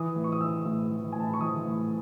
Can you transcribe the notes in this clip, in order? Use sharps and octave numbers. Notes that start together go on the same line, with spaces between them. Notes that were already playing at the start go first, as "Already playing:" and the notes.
Already playing: E3 D#6
A2
C#6
D#6
E3 E6
A2
E3
G#5
A2 A5
B5
C#6
E3 D#6
A2